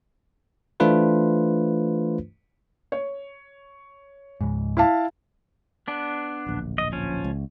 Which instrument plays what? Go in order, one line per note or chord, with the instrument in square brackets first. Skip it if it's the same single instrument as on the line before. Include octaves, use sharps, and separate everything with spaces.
[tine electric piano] E3 A3 D4 F4 B4 C5
[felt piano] C#5
[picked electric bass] C#2 G#2
[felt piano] E4 F5 A5
[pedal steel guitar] B3 D4
[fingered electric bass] D1 A#1
[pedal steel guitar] D#5
F3 C#4
[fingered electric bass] C#2